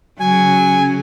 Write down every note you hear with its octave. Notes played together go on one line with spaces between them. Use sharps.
C#3 F#3 G#5